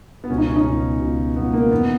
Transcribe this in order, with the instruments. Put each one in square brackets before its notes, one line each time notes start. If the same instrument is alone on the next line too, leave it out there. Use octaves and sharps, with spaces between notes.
[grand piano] B3
C#2 B2 C#4
D#4
C#4
D#4
C#2 B2 C#4
C#2 B2
C#2 B2 B3
A#3
E2 D#3 B3